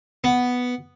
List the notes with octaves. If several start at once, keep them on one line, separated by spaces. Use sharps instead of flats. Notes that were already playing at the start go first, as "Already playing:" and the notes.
B3